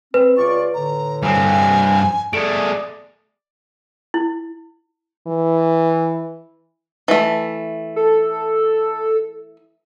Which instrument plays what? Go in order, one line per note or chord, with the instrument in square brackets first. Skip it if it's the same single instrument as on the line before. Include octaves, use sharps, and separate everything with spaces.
[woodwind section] C4 [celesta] B4
[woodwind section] C#2 F4 D5 [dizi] C#6
[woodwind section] A2 D3 [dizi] A#5
[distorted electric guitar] G2 C4 [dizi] G#5
[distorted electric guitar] A3 G#4 [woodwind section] D5 [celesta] D7
[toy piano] E4
[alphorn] E3
[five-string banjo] E3 A3
[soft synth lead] A4